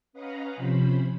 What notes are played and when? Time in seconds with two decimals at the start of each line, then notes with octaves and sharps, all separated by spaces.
0.13 C#4 B4 D#5 F5 F#5 A#5
0.52 C3 F3 C#4 C5 B5